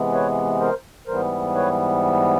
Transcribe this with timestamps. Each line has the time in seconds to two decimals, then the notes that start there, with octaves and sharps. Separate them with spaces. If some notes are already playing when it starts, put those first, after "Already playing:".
Already playing: C3 E3 G#3 B3
0.13 B4 C#5
0.60 A#4 C5
1.07 G#2 E3 G3 B3 A#4 C5
1.54 B4 C#5